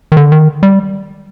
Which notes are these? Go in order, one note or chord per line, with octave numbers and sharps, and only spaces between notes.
D#3
D3
D#3
G3